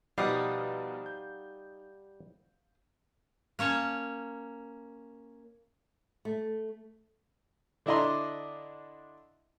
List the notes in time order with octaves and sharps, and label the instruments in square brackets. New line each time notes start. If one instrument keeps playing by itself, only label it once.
[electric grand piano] B2 F3 D7 [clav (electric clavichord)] G3 [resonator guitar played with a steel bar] D#4 [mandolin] F5 F#5 D#6
[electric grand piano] G6
[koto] A#3 C#4 C#5 A5
[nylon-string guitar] A3
[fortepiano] D3 D4 E4 D#5 A#5 C6